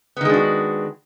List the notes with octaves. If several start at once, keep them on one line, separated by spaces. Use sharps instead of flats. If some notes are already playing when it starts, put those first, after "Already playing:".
D#3 G#3 B3 D4 F#4